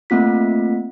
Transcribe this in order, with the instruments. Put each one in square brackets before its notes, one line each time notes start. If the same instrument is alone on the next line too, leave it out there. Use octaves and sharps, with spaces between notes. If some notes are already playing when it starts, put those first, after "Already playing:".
[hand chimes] A3 A#3 C4 F4 B6